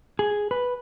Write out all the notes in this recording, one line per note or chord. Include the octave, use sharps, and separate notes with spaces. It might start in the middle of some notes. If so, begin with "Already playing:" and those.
G#4
B4